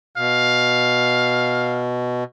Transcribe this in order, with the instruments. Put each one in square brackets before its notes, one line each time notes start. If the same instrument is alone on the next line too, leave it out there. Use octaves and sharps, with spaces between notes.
[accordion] B2 [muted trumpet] F5